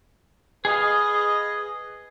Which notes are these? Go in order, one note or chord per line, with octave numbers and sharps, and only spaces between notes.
G#4 B4 D#5 F5